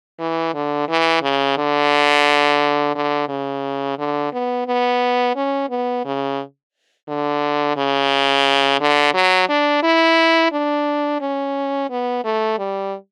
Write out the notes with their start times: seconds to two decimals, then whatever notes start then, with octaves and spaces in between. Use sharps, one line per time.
0.20 E3
0.54 D3
0.89 E3
1.22 C#3
1.58 D3
2.95 D3
3.29 C#3
3.99 D3
4.33 B3
4.67 B3
5.36 C#4
5.70 B3
6.05 C#3
7.08 D3
7.77 C#3
8.81 D3
9.14 F#3
9.49 D4
9.83 E4
10.52 D4
11.21 C#4
11.90 B3
12.25 A3
12.59 G3